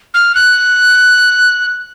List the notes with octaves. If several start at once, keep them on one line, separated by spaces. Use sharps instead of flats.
F6
F#6